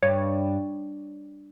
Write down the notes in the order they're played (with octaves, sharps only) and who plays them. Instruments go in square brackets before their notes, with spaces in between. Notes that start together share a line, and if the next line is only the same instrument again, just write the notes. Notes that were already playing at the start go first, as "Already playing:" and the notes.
[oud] G2 [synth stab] C#5